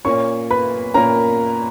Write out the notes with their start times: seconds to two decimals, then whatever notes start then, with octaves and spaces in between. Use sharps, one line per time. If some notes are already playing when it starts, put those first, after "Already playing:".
0.05 A#2 A#3 C#4 C#5 C#6
0.51 B4 B5
0.94 A#2 A#3 C#4 A#4 A#5